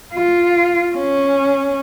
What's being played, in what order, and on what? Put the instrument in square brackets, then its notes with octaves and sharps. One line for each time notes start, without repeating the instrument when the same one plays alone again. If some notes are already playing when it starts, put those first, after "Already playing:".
[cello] F4
C#4